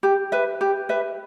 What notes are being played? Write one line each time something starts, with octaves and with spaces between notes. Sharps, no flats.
G4
B4 E5
G4
B4 E5